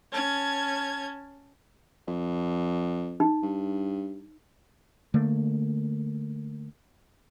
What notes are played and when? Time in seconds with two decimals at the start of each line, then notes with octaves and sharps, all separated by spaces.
0.11 C#4 A5 G#6
2.07 F2
3.20 D#4
3.43 G2
5.14 D3 A3 A#3